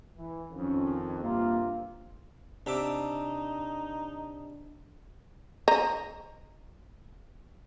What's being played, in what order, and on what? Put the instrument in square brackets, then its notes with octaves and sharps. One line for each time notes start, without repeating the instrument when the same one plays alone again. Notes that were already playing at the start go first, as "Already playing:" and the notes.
[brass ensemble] E3
[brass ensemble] F2 D#3 [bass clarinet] C#4
[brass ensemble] G2 C3 F4 [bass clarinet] A#3
[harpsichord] C3 E5 D6 [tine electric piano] D4 [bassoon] D#4
[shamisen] C5 D#5 A#5